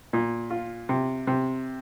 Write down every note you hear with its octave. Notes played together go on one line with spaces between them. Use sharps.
A#2
F4
C3
C3